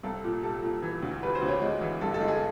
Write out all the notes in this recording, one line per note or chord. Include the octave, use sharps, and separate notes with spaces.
C2 A4
A#2
G3 A4
A#2
E3
D2
G3 B4
C5
D2
C#5
G#3
E3
G2 A4
A4
G#3
G#4